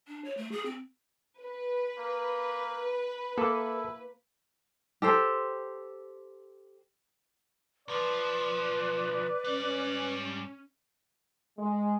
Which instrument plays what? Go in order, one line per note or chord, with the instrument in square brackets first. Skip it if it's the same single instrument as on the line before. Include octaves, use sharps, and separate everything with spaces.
[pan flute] D4
C#5
A3
G#4
C4
[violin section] B4
[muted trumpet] A#3
[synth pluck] A#3 [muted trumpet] E4 [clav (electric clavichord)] A4
[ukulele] G4 A4 C5
[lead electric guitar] B1 F3 [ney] B4 [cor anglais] D5
[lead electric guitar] G#2 G3 [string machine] C#4
[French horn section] G#3